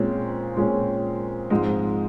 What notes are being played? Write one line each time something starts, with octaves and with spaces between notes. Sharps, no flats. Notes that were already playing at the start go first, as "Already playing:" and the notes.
Already playing: A#2 G#3 C4 C#4
A#2 G#3 C#4
G#2 F3 G#3 C4 D#4